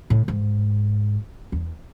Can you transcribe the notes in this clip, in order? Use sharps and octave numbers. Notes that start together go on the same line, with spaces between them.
A2
G#2
E2